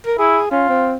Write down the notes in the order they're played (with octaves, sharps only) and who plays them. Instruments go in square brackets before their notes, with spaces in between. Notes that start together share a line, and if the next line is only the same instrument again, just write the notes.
[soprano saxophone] A#4
[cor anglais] E4 [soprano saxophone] G#4
[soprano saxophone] C#4 [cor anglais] F4
[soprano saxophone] C4